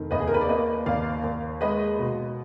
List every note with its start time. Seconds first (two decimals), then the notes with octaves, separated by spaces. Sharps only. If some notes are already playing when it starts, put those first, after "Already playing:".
Already playing: F1 D#3
0.11 D#2 B4 D#5
0.20 G#4
0.27 A#4
0.34 B4
0.41 D5
0.49 A#3 B4 D#5
0.86 D#2 D5 F5
1.24 D#2
1.61 G#3 B4 D#5
1.99 B2